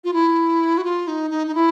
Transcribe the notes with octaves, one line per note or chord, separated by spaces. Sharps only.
F4
E4
F#4
F4
D#4
D#4
D#4
E4